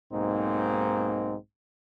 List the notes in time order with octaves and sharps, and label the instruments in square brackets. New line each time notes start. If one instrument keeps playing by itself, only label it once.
[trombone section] B1 G#2 A#3 C4 D#4